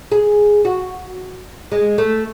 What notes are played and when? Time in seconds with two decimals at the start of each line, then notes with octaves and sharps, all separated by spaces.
0.12 G#4
0.65 F#4
1.72 G#3
1.98 A3